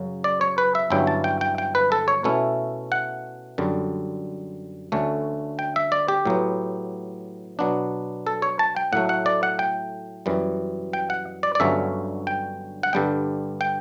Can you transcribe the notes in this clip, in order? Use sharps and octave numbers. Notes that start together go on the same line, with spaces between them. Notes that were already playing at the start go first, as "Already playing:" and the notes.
Already playing: F#2 C#3 F#3
D5
C#5
B4
E5
G1 G2 F#3 C#4 E4 G5
A5
G5
G5
G5
B4
A4
C#5
B2 A3 C#4 E4
F#5
F#2 D3 G3
D2 D3 A3 C#4
G5
E5
D5
G4
A2 F#3 B3
B2 F#3 B3 D4
A4
C#5
A5
G5
A2 F#3 A3 F#5
F#5
D5
F#5
G5
F#2 E3 G3
G5
F#5
D5
D5
G1 G2 D3 F#3 C#4 E5
G5
F#5
G2 D3 G3 D4 G5
G5